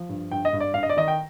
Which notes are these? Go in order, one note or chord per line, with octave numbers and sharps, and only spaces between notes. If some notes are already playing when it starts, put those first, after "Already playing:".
Already playing: F3
G2
G2 G5
D#5
G2
D5
G2 F5
D#5
D5
D#3 D#5
G5